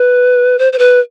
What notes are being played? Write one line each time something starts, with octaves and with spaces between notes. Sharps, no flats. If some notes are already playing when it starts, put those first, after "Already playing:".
Already playing: B4
C5
C5
B4